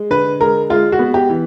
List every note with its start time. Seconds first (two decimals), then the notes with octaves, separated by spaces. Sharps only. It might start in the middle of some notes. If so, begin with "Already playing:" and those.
Already playing: G#3
0.10 D3 B4
0.40 G#3 A#4
0.70 G#3 F4
0.92 F#4
0.99 B3
1.14 G4
1.30 E3